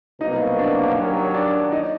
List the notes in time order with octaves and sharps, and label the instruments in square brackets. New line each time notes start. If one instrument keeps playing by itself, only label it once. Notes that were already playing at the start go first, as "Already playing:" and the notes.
[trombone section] C2 B2 F#3 A#3 [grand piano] D#4 D#5
[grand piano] D4 D5
[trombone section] D#2 D#3 F#3 [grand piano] C#4 C#5
[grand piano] C#5
D4 D5
D#4 D#5